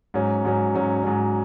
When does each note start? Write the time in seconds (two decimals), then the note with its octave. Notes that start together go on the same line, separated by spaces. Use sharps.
0.14 G#2 F#3 C#4
0.45 G#2 F#3 C#4
0.75 G#2 F#3 C#4
1.03 G#2 F#3 C#4